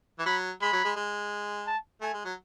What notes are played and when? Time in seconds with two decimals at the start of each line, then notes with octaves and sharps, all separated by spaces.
0.19 E3
0.26 F#3 B5
0.61 G#3 B5
0.73 F#3
0.85 G#3
0.96 G#3
1.67 A5
2.01 A3 G#5
2.14 G#3
2.25 F#3